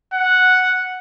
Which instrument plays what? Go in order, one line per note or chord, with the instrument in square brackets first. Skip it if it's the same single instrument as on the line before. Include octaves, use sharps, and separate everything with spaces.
[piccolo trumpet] F#5